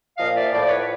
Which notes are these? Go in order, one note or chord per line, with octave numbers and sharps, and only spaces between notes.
A#2 F3 D#5 F5
D5 E5
A2 F3 C5 D5
B4 C#5